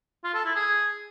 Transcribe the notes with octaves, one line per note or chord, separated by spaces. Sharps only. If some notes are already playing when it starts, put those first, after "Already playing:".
F4
A4
E4
G#4